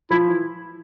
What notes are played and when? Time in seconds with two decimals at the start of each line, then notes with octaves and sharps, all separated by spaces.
0.10 F3 E4
0.27 E3